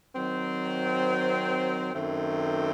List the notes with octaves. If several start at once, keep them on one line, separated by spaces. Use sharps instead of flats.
D#3 F#3 C4
F#2 D#3 A3 C4